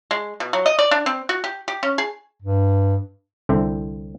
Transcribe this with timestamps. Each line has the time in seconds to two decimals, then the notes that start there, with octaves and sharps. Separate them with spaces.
0.11 G#3
0.40 B2
0.53 F#3
0.66 D#5
0.79 D5
0.91 D4
1.06 C4
1.29 F#4
1.44 G4
1.68 G4
1.83 C#4
1.98 G#4
2.42 G2
3.49 C2 D3 C4 E4